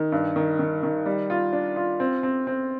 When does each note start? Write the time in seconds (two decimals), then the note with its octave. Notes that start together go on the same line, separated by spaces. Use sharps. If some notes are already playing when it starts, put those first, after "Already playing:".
Already playing: D#3
0.12 G2
0.36 D#3
0.59 D#3
0.83 D#3
1.06 G3
1.30 F4
1.53 D4
1.76 F4
2.00 C4
2.23 C4
2.47 C4